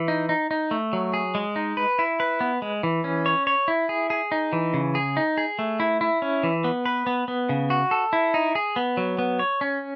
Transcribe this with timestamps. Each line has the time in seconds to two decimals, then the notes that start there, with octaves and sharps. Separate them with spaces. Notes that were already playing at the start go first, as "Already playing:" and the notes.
Already playing: E3
0.08 D#4
0.29 D#4
0.51 D#4
0.71 A3
0.93 F#3
1.14 G#4
1.35 G#3
1.56 D#4
1.77 B4
1.99 E4
2.20 B4
2.41 B3
2.62 G#3
2.83 E3
3.04 C#4
3.26 C#5
3.47 C#5
3.68 E4
3.89 G#4
4.10 G#4
4.32 D#4
4.53 E3
4.74 C#3
4.95 G#4
5.17 D#4
5.38 G#4
5.59 A3
5.80 E4
6.01 E4
6.22 C#4
6.43 E3
6.64 B3
6.86 B4
7.07 B3
7.28 B3
7.49 C#3
7.70 F#4
7.91 A4
8.13 E4
8.34 D#4
8.55 G#4
8.76 B3
8.97 F#3
9.19 B3
9.39 C#5
9.61 C#4